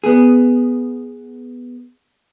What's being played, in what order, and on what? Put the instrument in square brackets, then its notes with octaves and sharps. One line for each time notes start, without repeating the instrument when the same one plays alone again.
[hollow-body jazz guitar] B3 G#4